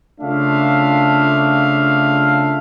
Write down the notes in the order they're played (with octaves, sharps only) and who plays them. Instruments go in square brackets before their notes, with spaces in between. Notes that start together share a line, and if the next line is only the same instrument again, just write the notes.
[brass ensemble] C#3 A3 D4 F4 E5 F5